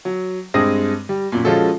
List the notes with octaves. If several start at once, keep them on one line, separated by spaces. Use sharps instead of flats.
F#3
G2 G#3 C4 D#6 A#6 D#7
G3
F#2 A#2
F3 G#3 C#4 F4 F#4 A4